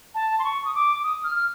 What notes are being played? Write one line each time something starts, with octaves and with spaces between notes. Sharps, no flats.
A5
C6
C#6
D#6
D6
D#6
F6
F6